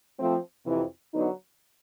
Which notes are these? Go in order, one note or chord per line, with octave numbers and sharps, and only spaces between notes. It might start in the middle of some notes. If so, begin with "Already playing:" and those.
F3 A3 C4
F2 C3 E3
D3 F#3 B3 D#4